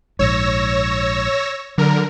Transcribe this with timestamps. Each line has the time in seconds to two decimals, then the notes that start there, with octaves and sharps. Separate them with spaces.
0.19 A#1 G#2 C#5 E6 A#6
1.78 D3 F#3 A#4